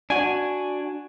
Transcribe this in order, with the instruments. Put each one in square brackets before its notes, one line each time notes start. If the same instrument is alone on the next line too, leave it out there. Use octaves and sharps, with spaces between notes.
[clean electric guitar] D4 F#4 [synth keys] G#5